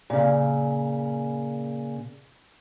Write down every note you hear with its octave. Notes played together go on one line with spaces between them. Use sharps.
A#2 C#3